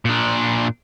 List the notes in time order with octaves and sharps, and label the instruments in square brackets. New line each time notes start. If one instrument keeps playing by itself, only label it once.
[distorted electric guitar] A#2 D4